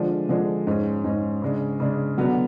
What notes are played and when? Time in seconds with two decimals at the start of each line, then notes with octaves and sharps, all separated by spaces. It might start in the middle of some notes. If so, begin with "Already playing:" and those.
Already playing: D3 F3 G#3 D4
0.29 D3 F3 G#3 D4
0.67 G#2 G#3 C#4
1.04 G#2 G#3 C#4
1.42 C#3 G#3 D4
1.80 C#3 G#3 D4
2.17 D3 F#3 B3 D4